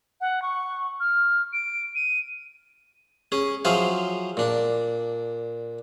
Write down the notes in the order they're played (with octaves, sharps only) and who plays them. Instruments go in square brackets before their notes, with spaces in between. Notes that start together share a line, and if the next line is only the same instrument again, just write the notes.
[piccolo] F#5
C#6
F6
D7
D#7
[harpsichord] C#4 G#4
F3 F#3 G#4 C5 E5 F5
A#2 D4